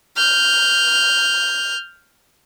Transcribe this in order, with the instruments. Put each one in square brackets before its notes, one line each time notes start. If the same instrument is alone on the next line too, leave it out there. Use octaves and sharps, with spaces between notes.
[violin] F6 G6